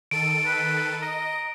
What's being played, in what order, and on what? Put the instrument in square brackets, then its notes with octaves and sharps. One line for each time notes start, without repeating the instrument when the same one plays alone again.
[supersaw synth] D#3 A4 D#7 [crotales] D7
[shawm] B4
[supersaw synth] D#5 [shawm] A#5